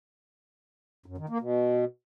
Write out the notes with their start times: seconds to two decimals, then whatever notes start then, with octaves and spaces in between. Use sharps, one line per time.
1.06 F#2
1.18 D#3
1.29 A#3
1.41 B2